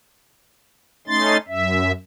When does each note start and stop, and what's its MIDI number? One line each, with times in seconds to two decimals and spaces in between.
1.07 1.37 57
1.07 1.37 61
1.07 1.37 63
1.07 1.37 84
1.07 1.37 93
1.48 1.92 42
1.48 1.92 76